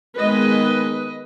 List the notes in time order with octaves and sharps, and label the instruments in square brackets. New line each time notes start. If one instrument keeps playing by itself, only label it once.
[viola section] D#3 G#3 B3 B4 D#5